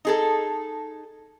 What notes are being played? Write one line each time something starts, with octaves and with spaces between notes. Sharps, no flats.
D#4 G#4 A4